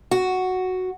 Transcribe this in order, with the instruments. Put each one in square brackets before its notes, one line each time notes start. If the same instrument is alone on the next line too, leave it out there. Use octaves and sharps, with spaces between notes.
[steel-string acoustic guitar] F#4